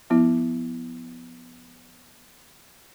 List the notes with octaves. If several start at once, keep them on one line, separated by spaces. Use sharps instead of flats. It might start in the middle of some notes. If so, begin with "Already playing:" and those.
F3 B3 E4